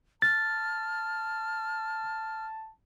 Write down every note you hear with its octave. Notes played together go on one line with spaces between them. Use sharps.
A5 F6 A6